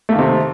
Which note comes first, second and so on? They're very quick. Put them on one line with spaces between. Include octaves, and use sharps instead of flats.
A3 A#3 D#3 C3